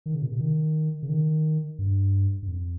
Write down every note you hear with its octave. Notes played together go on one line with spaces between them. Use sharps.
D#3
C#3
A#2
C3
D#3
C#3
D#3
G2
G2
F2